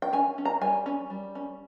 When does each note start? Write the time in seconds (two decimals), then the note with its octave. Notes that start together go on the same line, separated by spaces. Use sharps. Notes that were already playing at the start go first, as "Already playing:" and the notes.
0.02 G5
0.13 C#4 G#5
0.38 C#4
0.45 A#5
0.61 G3 G#5
0.86 C#4
1.10 G3
1.35 C#4